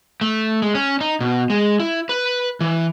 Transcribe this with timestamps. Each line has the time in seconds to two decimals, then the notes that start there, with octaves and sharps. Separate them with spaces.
0.21 A3
0.62 G#3
0.75 C#4
1.01 D#4
1.21 B2
1.50 G#3
1.80 E4
2.09 B4
2.61 E3